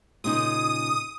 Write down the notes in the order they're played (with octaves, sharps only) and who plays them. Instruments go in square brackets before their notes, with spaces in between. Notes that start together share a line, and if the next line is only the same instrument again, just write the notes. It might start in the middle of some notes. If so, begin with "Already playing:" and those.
[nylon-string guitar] A#2 C#3 D#4 [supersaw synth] D#6